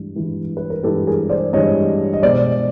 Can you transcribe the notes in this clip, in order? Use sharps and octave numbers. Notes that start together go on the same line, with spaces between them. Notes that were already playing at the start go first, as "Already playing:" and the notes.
Already playing: G2 E3 G#3
G2 E3 G#3
B4
A#4
G2 E3 G#3 G4 A4
G#4 A#4
C5 D5
G2 E3 G#3 C#5 D#5
D#5
B2 G#3 C5 D5